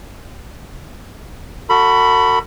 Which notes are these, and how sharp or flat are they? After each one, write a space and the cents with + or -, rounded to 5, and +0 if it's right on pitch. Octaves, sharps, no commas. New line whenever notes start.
F#4 +0 A4 +40 B5 +0